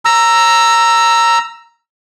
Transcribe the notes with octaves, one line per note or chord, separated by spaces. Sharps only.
A#5 E6